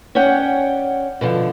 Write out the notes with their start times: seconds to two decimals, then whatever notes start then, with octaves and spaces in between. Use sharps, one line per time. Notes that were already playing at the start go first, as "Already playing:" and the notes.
0.15 C#4 C#5 D5 F#5 G5
1.21 B2 D3 F3